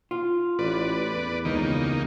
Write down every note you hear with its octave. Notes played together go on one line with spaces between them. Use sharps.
F4
A1 B4 D5
E2
C#2 D#3 A#3 D#4